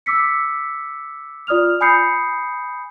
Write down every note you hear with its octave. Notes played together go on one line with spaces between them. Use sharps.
D6 E6 B6 C#7
F4 D5 D#6 F6 F7
G#5 B5 D#6 G6 C7 C#7